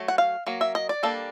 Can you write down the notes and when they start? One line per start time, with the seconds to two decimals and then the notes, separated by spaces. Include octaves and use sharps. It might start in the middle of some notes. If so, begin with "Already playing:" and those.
Already playing: F#3 A3
0.08 F#5
0.18 F5
0.47 F#3 A#3
0.61 E5
0.75 D#5
0.89 D5
1.03 G3 A#3 D4 A4